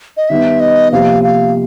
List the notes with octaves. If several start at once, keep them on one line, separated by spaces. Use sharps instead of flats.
D#5
D#3 G3 B3 E5
D#5
C3 F3 A#3 F5
F5